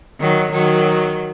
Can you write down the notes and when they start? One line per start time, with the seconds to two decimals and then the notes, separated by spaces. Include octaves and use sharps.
0.20 D#3 F#3
0.51 D#3 F#3